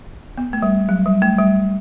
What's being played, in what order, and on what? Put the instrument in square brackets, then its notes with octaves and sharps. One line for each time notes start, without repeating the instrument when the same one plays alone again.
[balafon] B3
A3
G3
F#3
G3
A3
G3